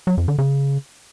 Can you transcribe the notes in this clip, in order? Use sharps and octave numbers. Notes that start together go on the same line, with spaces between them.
F#3
F2
D3
C#3